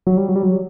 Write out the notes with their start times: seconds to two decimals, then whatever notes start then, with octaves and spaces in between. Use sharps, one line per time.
0.07 F#3
0.17 G3
0.29 F#3
0.36 G3
0.43 F#3